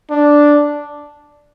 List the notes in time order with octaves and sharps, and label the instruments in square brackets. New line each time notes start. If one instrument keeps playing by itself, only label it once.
[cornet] D4